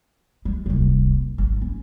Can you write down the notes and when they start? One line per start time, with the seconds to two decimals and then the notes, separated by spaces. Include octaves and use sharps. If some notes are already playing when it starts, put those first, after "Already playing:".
0.45 G#3
0.66 D#1 C2
1.38 G#1
1.62 C#4